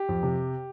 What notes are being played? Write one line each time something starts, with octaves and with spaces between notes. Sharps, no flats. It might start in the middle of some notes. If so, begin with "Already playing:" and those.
Already playing: G4
F2
C3